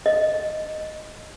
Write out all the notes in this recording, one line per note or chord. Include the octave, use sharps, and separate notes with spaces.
D#5